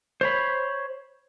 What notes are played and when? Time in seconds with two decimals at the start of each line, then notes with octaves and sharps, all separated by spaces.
0.21 C5 C#5 B5